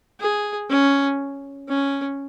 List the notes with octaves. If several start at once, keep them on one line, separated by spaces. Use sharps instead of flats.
G#4
C#4
C#4